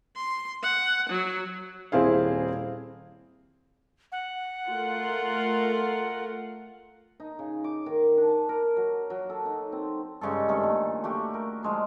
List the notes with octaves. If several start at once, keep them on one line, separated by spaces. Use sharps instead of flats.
C6
F#5
F#3
D#1 C4 E4 G#4 F5
F#5
A3 F4 A#4
D#4
C#3
D6
D#3
D4
A5
A#4
F#3
F#3
A4
D#4
C4
G2 C#3 G#3 A4
C3 D#3 A3 A4
A#2
A3 F#4 G4
A#4
F3 G#3 D4